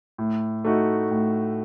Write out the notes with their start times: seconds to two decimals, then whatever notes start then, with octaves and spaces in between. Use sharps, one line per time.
0.18 A2
0.64 A3 D#4 F#4
1.11 A2